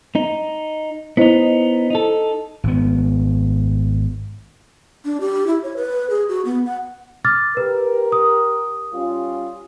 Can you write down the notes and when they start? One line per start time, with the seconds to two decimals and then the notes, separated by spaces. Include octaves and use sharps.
0.15 D#4
1.17 B3 D#4 E4 C5 D#5
1.90 D#4 A4
2.64 G#1 B3
5.05 D4
5.21 G4
5.47 E4
5.63 C#5
5.76 B4
6.10 G#4
6.29 F#4
6.45 B3
6.66 F#5
7.25 D6 F6 A6
7.57 G4 A#4 B4
8.12 D#6
8.93 G3 C#4 F4